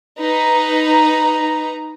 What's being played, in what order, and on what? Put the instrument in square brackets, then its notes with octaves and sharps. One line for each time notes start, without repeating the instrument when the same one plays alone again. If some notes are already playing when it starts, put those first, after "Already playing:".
[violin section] D#4 B4 A#5